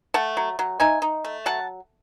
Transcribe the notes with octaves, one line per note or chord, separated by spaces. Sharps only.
A3 F#5 A5
F#3
F#3
D#4 E5 G#5
D#4
A3
F#3 F#5 A5